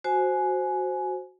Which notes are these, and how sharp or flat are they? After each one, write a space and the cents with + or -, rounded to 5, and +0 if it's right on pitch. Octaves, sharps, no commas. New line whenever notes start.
F#4 +0 C5 +0 G#5 +20